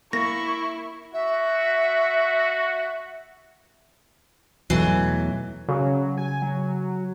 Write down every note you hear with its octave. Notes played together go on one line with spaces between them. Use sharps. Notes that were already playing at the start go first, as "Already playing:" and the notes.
A#3 E4 C#6 A#6
F#4 E5
E2 B2 E3 F#3 A3
C#3 F#3
G#5
F#3